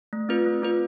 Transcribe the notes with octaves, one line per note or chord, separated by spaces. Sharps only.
A3
C4 F4 B4
A3
C4 F4 B4